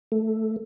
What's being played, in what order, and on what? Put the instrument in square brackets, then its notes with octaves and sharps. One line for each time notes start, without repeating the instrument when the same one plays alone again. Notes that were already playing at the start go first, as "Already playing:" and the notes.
[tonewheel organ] A3